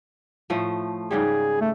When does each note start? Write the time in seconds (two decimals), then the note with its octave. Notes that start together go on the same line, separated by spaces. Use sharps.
0.50 A2 F3 A3
1.11 G#2 C#3 G3 G#4
1.61 A3